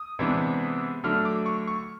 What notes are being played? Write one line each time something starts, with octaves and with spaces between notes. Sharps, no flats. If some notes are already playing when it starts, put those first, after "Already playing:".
Already playing: D#6
C3 E3 G#3 B3 D4
D3 F#3 A3 D4 F6
D6
C#6
C#6